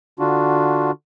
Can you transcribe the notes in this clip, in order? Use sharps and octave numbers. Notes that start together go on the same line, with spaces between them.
D3 D4 F4 F#4